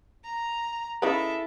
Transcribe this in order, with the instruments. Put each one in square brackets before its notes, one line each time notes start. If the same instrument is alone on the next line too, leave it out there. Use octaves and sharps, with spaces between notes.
[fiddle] A#5
[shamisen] C#3 D#4 B4 [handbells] E4 G#4 [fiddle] A4 E5